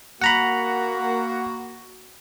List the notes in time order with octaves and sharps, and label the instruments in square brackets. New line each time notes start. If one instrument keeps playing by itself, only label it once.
[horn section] A#3 F#4 [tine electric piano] F#5 A#5 B5